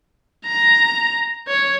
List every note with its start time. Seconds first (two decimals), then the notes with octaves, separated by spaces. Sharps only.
0.46 A#5
1.47 C#5